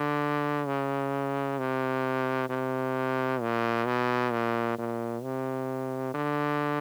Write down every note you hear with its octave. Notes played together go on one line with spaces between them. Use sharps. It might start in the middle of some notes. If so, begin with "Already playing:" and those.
Already playing: D3
C#3
C3
C3
A#2
B2
A#2
A#2
C3
D3